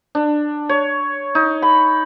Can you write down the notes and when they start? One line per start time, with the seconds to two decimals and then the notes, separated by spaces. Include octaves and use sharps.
0.15 D4
0.69 C#5
1.35 D#4
1.62 B5